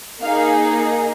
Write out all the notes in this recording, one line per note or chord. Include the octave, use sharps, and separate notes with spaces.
A#3 D#4 G#4 F5